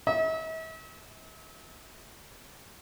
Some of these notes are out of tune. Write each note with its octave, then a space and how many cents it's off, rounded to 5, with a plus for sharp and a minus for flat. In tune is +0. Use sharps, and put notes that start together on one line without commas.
E5 -45